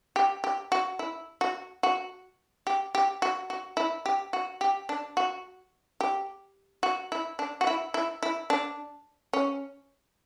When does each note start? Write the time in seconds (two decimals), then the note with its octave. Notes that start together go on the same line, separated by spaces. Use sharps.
0.16 G4
0.44 G4
0.72 F#4
0.99 E4
1.41 F#4
1.83 F#4
2.67 G4
2.95 G4
3.22 F#4
3.50 F#4
3.77 E4
4.06 G4
4.33 F#4
4.61 G4
4.89 D4
5.17 F#4
6.01 G4
6.83 F#4
7.12 E4
7.39 D4
7.61 F#4
7.67 E4
7.94 E4
8.23 E4
8.50 D4
9.33 C#4